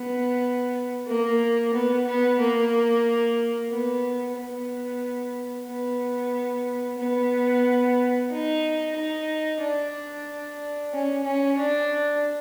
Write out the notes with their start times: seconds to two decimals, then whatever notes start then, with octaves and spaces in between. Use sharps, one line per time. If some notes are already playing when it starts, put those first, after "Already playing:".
Already playing: B3
1.07 A#3
1.74 B3
2.07 B3
2.39 A#3
3.70 B3
4.37 B3
5.68 B3
6.98 B3
8.30 D#4
8.96 D#4
9.61 D4
10.93 C#4
11.25 C#4
11.57 D4